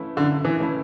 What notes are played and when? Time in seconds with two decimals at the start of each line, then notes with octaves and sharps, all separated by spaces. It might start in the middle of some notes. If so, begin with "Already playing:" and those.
Already playing: E3 A3 C#4 E4
0.16 F#2 D3
0.45 E3
0.58 E3 A3 C#4 E4